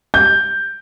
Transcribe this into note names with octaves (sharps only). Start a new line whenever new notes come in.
G6